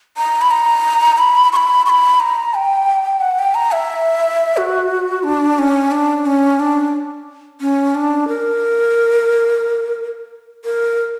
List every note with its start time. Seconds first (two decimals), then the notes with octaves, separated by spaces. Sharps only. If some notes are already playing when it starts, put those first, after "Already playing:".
0.17 A#5
0.41 B5
0.51 A#5
1.18 B5
1.53 C#6
1.56 B5
1.86 C#6
1.89 B5
2.20 A#5
2.54 G5
3.21 F#5
3.39 G5
3.55 A#5
3.72 E5
4.57 F#4
5.24 D4
5.58 C#4
5.91 D4
6.26 C#4
6.60 D4
7.61 C#4
7.95 D4
8.28 A#4
10.65 A#4